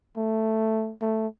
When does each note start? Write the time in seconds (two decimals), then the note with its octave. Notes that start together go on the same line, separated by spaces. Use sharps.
0.17 A3
1.02 A3